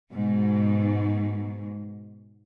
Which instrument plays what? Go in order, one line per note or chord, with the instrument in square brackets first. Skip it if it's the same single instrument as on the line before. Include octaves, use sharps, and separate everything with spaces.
[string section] G#2 B2